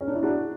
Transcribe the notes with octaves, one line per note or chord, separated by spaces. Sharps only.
C#4
D4
E4
D4 F#4